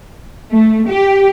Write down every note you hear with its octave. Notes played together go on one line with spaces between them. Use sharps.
A3
G4